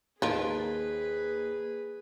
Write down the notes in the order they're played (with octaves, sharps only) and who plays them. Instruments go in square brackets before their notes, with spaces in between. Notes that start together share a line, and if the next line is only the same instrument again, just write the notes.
[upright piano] D#2 D#4 [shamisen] F3 F4 A#4 [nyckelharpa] G#4 B4